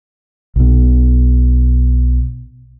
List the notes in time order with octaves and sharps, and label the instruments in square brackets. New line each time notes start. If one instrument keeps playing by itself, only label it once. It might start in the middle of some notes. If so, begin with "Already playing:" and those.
[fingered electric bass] B1 B2